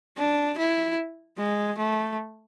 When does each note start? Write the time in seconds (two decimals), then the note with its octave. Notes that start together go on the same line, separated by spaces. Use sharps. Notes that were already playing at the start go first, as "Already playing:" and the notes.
0.17 D4
0.58 E4
1.38 G#3
1.78 A3